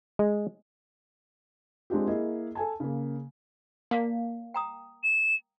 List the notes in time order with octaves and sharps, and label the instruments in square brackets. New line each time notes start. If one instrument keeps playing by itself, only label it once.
[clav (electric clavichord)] G#3
[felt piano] G#3 C4 D4 F4 G4
A#3 E4 G#4 D#5
A4 G#5 A5
C#3 A#3
[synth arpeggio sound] A#3 [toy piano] D5 F5 A5
[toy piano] G5 A#5 D#6
[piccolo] E7